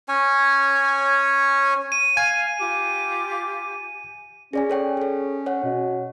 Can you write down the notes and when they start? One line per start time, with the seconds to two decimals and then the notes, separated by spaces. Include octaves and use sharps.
0.08 C#4 C#5 G#5
1.92 D#7
2.17 F5 G#5
2.60 F4 G4 D6
4.53 C#4 G#4 D5 G#5
4.70 A4 C#5 G5
4.97 G#4 A4
5.46 C#5 F#5
5.64 B2